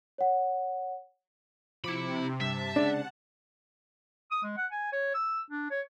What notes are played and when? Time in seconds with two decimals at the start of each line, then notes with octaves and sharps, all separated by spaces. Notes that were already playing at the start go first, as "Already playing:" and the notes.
0.18 C#5 F#5
1.84 C3 F3 E4 B5 D6 C#7
2.40 G2 E5 A5
2.76 C#3 G#3 D4 F#5
4.32 D#6
4.44 G#3
4.57 F#5
4.72 G#5
4.93 C#5
5.14 E6
5.51 D4
5.71 C#5